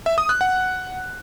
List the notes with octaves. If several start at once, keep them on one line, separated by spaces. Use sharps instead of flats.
E5
D#6
F#6
F#5